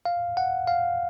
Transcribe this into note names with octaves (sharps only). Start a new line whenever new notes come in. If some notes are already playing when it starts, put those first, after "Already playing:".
F5
F#5
F5